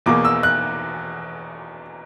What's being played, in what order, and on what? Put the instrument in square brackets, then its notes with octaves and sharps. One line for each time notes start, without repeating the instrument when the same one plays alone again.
[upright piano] E2 B2 A#3 D6
E6
F#6